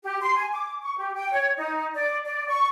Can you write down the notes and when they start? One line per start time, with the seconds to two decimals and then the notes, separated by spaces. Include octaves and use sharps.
0.03 G4
0.20 C6
0.37 G#5
0.52 D6
0.82 C#6
0.98 G4
1.15 G5
1.32 C#5
1.57 D#4
1.94 D5
2.25 D5
2.48 C#6